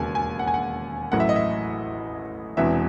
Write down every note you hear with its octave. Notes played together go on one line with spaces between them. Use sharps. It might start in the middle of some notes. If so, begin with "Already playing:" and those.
Already playing: E1 D#2 C#3 G#5
G#5
F#5
G#5
F#5
A1 A2 F#3 F#5
E5
D#5
E5
E1 E2 C3 E3 E5